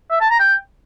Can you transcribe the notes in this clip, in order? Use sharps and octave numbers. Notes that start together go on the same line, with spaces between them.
E5
A5
A#5
G5